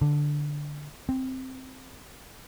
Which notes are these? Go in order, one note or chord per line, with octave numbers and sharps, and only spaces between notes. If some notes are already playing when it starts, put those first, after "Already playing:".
D3
C4